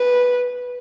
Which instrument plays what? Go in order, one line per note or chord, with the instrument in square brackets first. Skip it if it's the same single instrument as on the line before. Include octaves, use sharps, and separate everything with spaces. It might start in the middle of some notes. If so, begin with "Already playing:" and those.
Already playing: [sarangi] B4